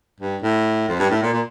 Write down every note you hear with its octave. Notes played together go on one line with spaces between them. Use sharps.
G2
A2
F2
G2
A2
A#2
A#2